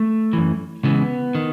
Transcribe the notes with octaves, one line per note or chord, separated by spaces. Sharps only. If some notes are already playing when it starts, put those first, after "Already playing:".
Already playing: A3
F#2 E3
C#2 C#3 E3 B3
D#3